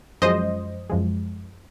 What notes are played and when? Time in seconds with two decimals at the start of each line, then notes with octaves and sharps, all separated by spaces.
0.22 F#2 F3 G#3 C5 D#5
0.90 F#2 F3 G#3